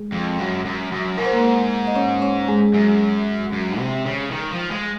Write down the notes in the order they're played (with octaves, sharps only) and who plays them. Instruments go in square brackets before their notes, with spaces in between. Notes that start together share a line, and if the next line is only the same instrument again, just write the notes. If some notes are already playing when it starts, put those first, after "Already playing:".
Already playing: [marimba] G#3 G#4
[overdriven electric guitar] F2
F#2
F#2
F#2
[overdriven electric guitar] G#2 [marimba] A#4
[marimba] C5
A#3 A#4
D#5
C#4 C#5
C#4 C#5
G#3 G#4
[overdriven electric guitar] F#2 [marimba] G#3 G#4
[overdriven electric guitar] F#2
C3
C#3
D#3
F3
G#3